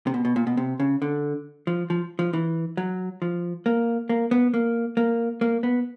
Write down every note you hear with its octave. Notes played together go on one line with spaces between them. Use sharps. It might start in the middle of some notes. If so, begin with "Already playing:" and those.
C3
B2
B2
A#2
B2
C3
C#3
D3
F3
F3
F3
E3
F#3
F3
A#3
A#3
B3
A#3
A#3
A#3
B3